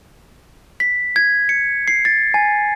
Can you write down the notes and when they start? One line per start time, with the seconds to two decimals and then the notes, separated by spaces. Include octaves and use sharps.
0.80 B6
1.16 G#6
1.49 C#7
1.88 C7
2.05 A6
2.34 G#5